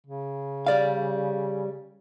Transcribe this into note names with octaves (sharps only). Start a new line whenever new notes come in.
C#3
G3 D5 F5